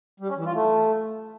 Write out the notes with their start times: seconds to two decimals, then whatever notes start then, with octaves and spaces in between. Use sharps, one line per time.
0.20 G3
0.28 C#4
0.37 E3
0.45 F4
0.53 A3